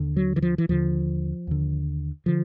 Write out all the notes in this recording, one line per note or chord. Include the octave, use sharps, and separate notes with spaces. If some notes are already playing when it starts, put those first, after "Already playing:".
Already playing: D#2 D3
F#3
E3
F3
E3
D#2 D3 F3
D#2 D3
D3 F3